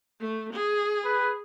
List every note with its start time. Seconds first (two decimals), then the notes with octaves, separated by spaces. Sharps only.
0.21 A3
0.53 G#4
1.05 B4